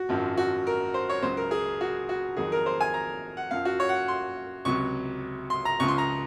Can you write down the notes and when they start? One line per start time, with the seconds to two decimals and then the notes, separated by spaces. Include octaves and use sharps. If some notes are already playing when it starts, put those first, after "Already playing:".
Already playing: F#4
0.09 G#1 F#2 F3
0.37 F#4
0.67 A#4
0.94 C5
1.09 C#5
1.23 C#2 C#3 F#3 C5
1.37 A#4
1.51 G#4
1.81 F#4
2.09 F#4
2.37 F2 D#3 F#3 G#4
2.52 A#4
2.66 C5
2.81 G#5
2.94 A#5
3.37 F#5
3.51 F#2 F3 F5
3.65 F#4
3.80 C#5
3.89 F#5
4.08 C6
4.65 C#2 C3 F#3 C#6
5.50 C6
5.65 A#5
5.80 C#2 C#3 F3 C#6
5.88 C6
5.98 A#5